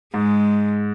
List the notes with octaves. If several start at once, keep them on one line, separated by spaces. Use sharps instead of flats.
G#2 G#3